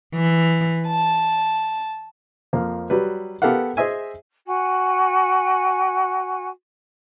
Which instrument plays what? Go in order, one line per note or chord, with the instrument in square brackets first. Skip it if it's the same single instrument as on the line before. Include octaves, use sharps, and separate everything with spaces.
[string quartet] E3
A5
[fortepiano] F2 F3 A#3
F#3 G3 B4
B3 G4 A4 A#4 F5 F#5
G#4 C5 D#5 E5 G#5
[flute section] F#4 G#5